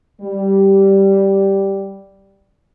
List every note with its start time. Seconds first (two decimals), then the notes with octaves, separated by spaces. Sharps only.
0.22 G3